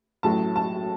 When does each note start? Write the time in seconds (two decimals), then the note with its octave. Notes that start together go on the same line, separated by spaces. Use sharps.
0.23 A1 A2 F#3 A5
0.56 A5